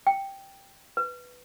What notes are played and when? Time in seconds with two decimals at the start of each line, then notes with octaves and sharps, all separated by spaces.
0.07 G5
0.97 B4